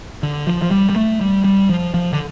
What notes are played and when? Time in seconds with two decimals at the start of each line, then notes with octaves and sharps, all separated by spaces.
0.23 D3
0.47 F3
0.62 F3
0.71 G3
0.89 G3
0.96 A3
1.21 G3
1.44 G3
1.69 F3
1.94 F3
2.13 D3